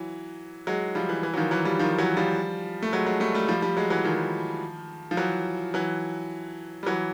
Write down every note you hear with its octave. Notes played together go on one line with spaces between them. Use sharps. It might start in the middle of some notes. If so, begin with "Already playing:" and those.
Already playing: E3 F#3
F#3 G#3
F3 G3
E3
E3
F#3
D#3 F3
E3 F#3
F3 G3
D#3 F3
E3 F#3
F3 G3
A3
F#3 G#3
F#3 G#3
G3 A3
G3 A3
F3 G3
F3 G3
F#3 G#3
E3 F#3
D#3 F3
F3
E3 F#3
E3 F#3
G3
E3 F#3